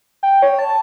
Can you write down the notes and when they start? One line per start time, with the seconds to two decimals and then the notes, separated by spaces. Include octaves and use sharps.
0.23 G5
0.42 C#5
0.59 A5